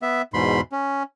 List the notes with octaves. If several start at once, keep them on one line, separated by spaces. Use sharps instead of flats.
B3 E5
E2 G#2 B2 B5 C6
C#4